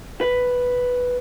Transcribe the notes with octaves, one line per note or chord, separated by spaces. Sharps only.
B4